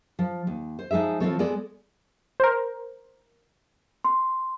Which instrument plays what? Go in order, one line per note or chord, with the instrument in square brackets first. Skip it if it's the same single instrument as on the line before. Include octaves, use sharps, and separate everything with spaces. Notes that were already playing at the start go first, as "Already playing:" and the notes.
[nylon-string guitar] F3
D#2
C5
F3 G#3 D#4 G#4 E5
E3 F3 A#3 C4 A4 C#5
G#3 B3 G#4 A4 D5
[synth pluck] A#4 C5
[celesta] C6